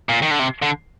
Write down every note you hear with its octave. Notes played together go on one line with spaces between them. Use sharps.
A#2
D#3
D3
C3
D3